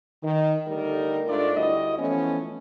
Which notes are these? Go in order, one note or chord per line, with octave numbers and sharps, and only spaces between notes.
D#3
D3 G3 A3 D#4 A#4
G#2 A3 D4 F4 A#4 D5
D2 G3 E4 F#4 D#5
E3 F3 A3 B3 C#4